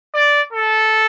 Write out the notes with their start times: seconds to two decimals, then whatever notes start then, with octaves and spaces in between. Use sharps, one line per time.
0.14 D5
0.53 A4